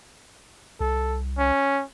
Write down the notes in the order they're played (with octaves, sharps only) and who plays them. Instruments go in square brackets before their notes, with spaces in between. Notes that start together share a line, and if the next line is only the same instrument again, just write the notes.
[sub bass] C2 [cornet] A4
[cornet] C#4